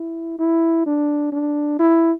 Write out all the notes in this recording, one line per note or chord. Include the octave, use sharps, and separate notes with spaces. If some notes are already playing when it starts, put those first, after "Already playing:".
Already playing: E4
E4
D4
D4
E4